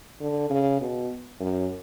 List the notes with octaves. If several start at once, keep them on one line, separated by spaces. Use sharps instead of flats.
D3
C#3
B2
F#2